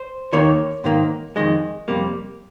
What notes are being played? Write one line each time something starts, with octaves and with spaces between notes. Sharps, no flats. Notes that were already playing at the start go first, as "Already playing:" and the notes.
Already playing: C5
D#2 D#3 A#3 C#5
G#2 D#3 A#3
F2 C3 D#3 G#3 D#5
F2 C3 G3 A#3